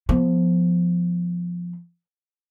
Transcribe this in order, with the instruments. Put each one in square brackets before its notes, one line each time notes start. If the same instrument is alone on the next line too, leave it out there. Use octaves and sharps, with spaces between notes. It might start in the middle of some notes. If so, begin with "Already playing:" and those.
[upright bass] F3 B3